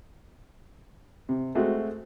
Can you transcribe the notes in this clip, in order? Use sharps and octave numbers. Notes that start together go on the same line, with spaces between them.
C3
G#3 A3 C4 F#4